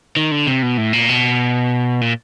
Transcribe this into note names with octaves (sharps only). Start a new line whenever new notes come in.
D#3
D3
C3
B2
A2
A#2
B2
A#2